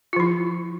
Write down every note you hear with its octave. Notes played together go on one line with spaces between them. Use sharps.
F3 E4 F4